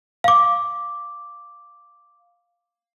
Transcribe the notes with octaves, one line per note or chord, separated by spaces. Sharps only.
F5 D6